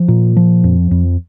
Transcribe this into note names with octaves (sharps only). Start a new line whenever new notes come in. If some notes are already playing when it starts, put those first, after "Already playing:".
Already playing: F3
A#2
F3
F2
F2